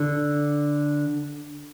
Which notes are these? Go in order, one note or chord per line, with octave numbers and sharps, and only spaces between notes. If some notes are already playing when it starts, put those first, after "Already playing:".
Already playing: D3